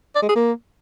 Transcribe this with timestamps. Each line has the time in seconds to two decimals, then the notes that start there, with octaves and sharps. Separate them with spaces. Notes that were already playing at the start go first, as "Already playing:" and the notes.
0.16 D5
0.22 G#3
0.29 G#4
0.36 A#3